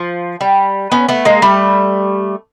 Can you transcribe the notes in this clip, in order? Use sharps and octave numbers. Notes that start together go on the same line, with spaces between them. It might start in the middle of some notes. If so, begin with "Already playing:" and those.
Already playing: F3
G3
B3 C#4
A3 B3
G#3 A#3
G3 A3